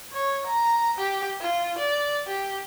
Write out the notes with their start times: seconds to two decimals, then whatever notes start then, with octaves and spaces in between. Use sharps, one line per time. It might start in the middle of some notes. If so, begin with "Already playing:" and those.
0.12 C#5
0.46 A#5
0.98 G4
1.40 F4
1.78 D5
2.27 G4